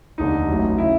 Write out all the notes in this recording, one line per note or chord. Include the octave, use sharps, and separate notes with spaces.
F1 D#2 D3 D#4
A1 A2 F#3
C#3 E4